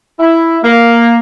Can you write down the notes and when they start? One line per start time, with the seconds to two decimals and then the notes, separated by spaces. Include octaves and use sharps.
0.19 E4
0.64 A#3